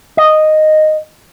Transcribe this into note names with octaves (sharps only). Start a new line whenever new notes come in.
D#5